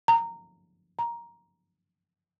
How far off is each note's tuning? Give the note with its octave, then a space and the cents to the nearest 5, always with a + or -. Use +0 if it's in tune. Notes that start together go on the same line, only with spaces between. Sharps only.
A#5 -15
A#5 +10